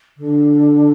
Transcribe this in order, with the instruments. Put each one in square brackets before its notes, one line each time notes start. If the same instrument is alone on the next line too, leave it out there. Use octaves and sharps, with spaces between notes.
[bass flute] D3